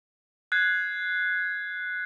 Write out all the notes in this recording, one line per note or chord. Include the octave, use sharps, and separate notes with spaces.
F#6 G#6 C7